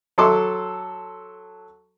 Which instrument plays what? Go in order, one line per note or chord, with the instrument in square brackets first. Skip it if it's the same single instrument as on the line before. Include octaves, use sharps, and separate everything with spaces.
[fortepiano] F#3 A4 C6 D6